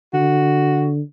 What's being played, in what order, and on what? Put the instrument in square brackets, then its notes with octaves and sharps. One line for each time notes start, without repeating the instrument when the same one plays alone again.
[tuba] D3 [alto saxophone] F#4